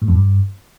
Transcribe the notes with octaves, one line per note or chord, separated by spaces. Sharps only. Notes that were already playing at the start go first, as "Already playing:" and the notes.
A2
F2
G2